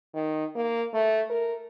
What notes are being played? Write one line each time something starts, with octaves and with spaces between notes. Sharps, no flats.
D#3
A#3
A3
A#4